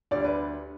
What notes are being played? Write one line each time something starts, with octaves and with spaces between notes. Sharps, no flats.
D2 D3 G3 D5
B4